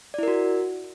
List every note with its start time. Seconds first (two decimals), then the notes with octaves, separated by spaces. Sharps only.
0.14 D5
0.18 E4
0.23 A#4
0.28 F#4